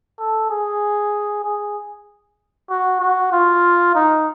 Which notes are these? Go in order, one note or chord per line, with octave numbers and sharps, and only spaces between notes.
A4
G#4
G#4
F#4
F#4
F4
D#4